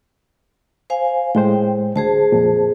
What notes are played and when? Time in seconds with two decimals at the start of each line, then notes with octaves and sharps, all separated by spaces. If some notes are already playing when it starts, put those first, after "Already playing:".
0.90 C5 F5 G#5
1.35 A2 G#3 C5 G5
1.96 D2 G#4 C5 A5
2.32 F2 A#2